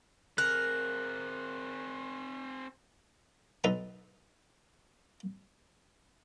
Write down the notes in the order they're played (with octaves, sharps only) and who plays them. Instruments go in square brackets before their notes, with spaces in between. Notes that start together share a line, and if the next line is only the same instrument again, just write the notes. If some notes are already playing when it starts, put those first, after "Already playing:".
[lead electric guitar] C4 G#4 [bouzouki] A#4 [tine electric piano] F#6
[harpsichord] B1 D#4 A4 B4 A#5